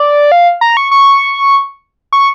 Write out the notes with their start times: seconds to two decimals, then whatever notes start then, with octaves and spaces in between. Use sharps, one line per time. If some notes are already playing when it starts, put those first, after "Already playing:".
Already playing: D5
0.32 F5
0.61 A#5
0.77 C#6
0.91 C#6
2.13 C#6